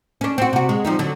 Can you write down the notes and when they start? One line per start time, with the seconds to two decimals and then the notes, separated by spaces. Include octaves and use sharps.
0.21 C#4 D4
0.38 C4 F#4
0.53 C3 F#4
0.69 G#3
0.85 F3 G3 D#4
0.99 D3 F#3